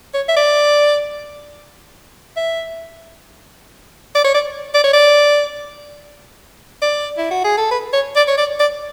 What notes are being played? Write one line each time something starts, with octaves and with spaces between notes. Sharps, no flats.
C#5
E5
D5
E5
D5
C#5
D5
D5
C#5
D5
D5
E4
F#4
G#4
A4
B4
C#5
D5
C#5
D5
D5